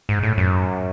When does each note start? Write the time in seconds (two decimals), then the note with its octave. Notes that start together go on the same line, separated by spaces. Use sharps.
0.09 G#2
0.23 A2
0.38 F#2